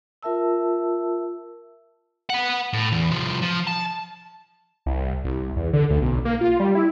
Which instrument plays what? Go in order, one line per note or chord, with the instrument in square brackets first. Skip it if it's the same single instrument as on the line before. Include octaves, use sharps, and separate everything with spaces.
[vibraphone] F4 A#4 E5 A5 E6
[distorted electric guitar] B4 F#5
A2
E2
C2 F3
F3
A5
[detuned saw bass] C2
C2
E2
D3
D2
B1
A#3
F4
G3
E4